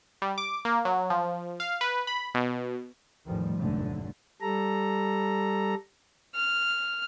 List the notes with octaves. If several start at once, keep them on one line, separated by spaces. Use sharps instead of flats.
G3
D6
A#3
F#3
F3
F5
B4
B5
B2
A1 E2 A2 D#3 F3 G3
F1 D#2 G#2 D3 F#3 A3
G3 A4 A#5
F6